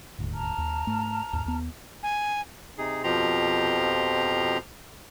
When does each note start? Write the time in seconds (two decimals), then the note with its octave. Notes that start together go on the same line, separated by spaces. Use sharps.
0.18 D#1 D2 G#2
0.32 A5 A#5 F6
0.58 D#2
0.87 G#2 A3
1.33 D#2 G#2
1.46 D#2 B3
2.03 G#5
2.78 C3 D#4 G#4
3.04 F2 B2 F3 G4 A#5 C6